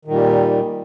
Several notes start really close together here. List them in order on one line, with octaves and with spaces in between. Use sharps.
D#3 A#2 G3